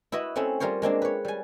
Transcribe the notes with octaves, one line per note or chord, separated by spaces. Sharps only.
E4 F#4 B4 D#5
A3 C4 C#4 E4
G3 F4 A#4 C5 C#5
G#3 A#3 C4 D4
B4 C#5
G3 G#5